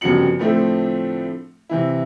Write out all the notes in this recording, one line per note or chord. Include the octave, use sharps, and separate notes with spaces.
G1 F2 C#3 F#4 C#7 F#7
A2 D3 F3 A3 C4
C3 E3 E4